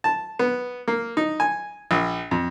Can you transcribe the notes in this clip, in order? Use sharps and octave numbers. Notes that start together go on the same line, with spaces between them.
A5
B3
A#3
D#4
G#5
A#1
F2